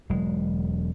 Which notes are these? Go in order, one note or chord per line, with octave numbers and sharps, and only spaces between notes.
E1 F#3 G#3